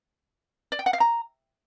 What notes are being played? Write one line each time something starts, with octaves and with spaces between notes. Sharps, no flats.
D5
G5
F#5
F5
A#5